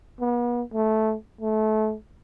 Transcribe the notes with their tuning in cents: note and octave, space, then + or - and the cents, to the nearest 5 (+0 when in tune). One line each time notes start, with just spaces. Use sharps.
B3 -40
A3 -10
A3 -25